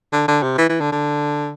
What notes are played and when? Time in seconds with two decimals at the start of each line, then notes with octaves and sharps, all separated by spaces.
0.13 D3
0.28 D3
0.43 C3
0.58 E3
0.69 E3
0.81 D3
0.92 D3